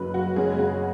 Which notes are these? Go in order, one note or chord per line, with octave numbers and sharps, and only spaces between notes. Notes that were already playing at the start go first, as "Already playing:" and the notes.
Already playing: F#1 F#2 F#3 B4
F#4
F#1 F#2 C#3 G#3 C#4 G#4
F#4